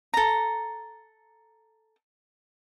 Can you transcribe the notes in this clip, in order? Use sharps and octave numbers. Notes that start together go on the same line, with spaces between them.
A4 A#5